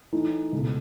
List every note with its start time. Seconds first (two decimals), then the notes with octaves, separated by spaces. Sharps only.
0.12 E3 A3 D#4
0.53 C#2 B2 A3